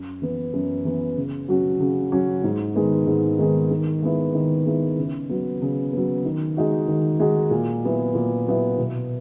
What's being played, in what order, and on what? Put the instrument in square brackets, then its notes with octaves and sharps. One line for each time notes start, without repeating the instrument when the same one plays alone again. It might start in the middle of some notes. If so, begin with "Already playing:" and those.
Already playing: [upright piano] F#2
E3 B3
F#2
E3 B3
C#3
F#3 C#4 F#4
C#3
F#3 C#4 F#4
G#2
D#3 G#3 B3
G#2
D#3 G#3 B3
D#3
G#3 B3 E4
D#3
G#3 B3 E4
C#3
F#3 B3
C#3
F#3 B3
D#3
G#3 D#4 F#4
D#3
G#3 D#4 F#4
A#2
F#3 B3 E4
A#2
F#3 B3 E4
B2